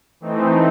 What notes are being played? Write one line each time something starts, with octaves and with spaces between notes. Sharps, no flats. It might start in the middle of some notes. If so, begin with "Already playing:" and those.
E3 A3 C4 D#4